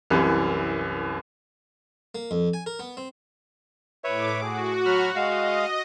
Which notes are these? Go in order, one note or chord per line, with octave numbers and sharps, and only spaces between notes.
C2 F#2 C3 E3
A#3
F2
G#5
A#4
B3
C4
A2 B4 C#5 E5 D6
F#4 G#4
F#3 B5 F6
G#3 D#5 F5